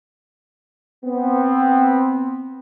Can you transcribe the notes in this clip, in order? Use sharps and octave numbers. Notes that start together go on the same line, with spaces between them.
B3 C4